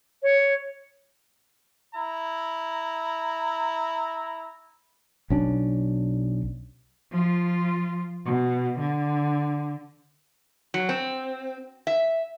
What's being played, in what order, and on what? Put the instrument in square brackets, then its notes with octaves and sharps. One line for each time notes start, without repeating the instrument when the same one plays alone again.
[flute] C#5
[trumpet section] E4 A#5
[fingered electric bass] B1 C#4 D4
[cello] F3 F4
B2
D3
[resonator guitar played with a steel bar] F#3
C4
E5